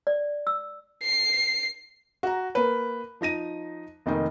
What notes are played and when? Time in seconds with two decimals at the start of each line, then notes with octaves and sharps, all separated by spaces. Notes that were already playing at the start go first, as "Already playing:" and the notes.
0.07 D5
0.47 E6
1.03 C7
2.23 F#4 A#5
2.55 A#3 B4
3.21 F3 D#4 A#6 D#7
4.06 F1 D#3 A#3 D#4